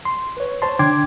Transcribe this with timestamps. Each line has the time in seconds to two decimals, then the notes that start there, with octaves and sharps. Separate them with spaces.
0.05 C6
0.37 B4 C#5
0.62 C5 C#5 A5 C6
0.79 D3 D4 G5 C6 D6 G#6